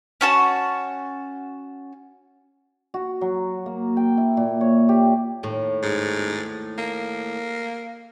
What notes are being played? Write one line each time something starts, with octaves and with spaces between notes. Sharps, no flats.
C#4 F#4 A5
F#4
F#3
A#3
G5
E4
A#2
C#5
G4
D#2 A2
G#2
A#3